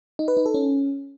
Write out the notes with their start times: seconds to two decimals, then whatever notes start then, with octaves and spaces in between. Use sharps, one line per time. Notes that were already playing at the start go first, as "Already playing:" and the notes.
0.19 D#4
0.28 B4
0.37 D#4
0.46 A4
0.54 C#4